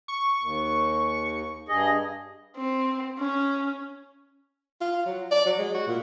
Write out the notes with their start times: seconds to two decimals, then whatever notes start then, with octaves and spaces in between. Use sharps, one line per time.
0.08 C#6
0.42 D#2
1.69 G2 G#4 D#5
2.57 C4
3.19 C#4
4.81 F4
5.06 F#3
5.31 D5
5.46 F#3
5.59 G#3
5.75 F#4
5.87 A#2